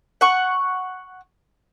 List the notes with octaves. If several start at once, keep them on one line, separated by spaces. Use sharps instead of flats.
F#5 C#6